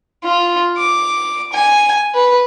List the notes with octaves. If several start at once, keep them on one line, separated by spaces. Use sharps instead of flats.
F4
D6
G#5
B4